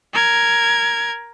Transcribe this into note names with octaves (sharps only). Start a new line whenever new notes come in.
A#4 G#6